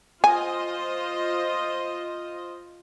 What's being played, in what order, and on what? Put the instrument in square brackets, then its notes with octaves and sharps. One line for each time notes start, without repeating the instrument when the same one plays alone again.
[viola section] F4 C5 D#5 [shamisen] G#5